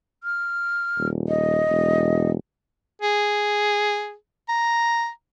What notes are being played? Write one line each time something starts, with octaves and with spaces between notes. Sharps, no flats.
F6
D#1
D#5
E1
G#4
A#5